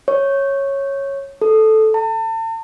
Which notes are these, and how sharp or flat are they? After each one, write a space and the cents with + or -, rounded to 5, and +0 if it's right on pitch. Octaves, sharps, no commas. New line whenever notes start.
C#5 -10
A4 -10
A5 +40